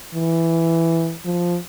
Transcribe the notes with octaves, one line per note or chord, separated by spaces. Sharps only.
E3
F3